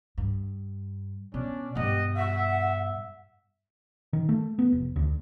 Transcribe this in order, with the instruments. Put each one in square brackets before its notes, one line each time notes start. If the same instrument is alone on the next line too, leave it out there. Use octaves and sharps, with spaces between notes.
[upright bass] G2
[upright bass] B2 [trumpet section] C#4 D4 D5
[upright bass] G2 B2 [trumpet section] G4 D#5 F#5
[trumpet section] E5 [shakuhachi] F#5
[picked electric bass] D#3
A3
B3
F1
D2